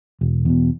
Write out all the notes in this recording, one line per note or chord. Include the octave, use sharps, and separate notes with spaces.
E1
E2 B2